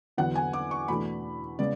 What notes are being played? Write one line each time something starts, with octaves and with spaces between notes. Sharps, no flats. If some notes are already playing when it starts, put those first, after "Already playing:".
E2 D3 F#3 B3 D4 F#5
G#5
D6
C#6
E2 B2 A3 D4 B5
C#3 G#3 B3 D5